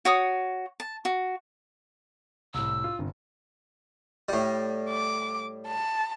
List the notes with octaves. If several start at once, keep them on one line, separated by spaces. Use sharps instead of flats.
F#4 C#5 D#6
A5
F#4
C2 A2 E6
F4
G1 G2 C3
A2 G3
D6
A5